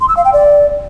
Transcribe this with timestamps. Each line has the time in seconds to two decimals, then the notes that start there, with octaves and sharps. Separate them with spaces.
0.01 C6
0.09 E6
0.17 F5
0.25 G5
0.33 D5